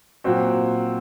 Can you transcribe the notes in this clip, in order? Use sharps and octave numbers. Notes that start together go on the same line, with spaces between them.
A#2 F#3 C4 F#4